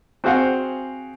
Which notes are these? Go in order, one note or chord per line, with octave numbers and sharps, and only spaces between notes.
C4 F#4 G#4 C5 F5 F#5